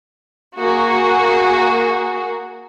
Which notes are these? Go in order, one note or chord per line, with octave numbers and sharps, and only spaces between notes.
A#3 F#4 G#4